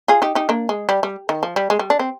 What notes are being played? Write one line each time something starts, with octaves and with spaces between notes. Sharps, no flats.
F4 G#4
D#4 G4
D#4 G4
A#3 D4
G#3
G3
G3
D#3
F3
G3
G#3
G3
D4
C4